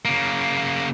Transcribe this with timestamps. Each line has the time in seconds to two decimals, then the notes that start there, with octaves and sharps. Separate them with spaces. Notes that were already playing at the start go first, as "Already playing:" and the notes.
0.05 C#3 A#3